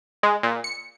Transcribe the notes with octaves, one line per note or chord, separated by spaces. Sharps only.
G#3
A#2
C#7